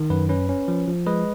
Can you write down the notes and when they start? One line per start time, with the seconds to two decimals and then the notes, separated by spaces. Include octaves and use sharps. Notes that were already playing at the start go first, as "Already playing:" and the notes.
Already playing: D#3
0.10 F#2 B4
0.29 C#4 B4
0.49 C#4
0.68 F3
0.88 F3
1.07 G#3 B4 D#5